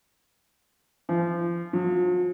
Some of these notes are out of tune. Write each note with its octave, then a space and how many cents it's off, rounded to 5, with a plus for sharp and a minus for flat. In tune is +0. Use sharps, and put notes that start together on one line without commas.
F3 -30
F3 +45